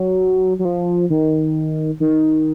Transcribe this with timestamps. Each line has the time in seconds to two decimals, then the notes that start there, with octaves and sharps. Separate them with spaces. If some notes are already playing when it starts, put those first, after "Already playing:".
Already playing: F#3
0.59 F#3
0.65 F3
1.10 D#3
2.00 D#3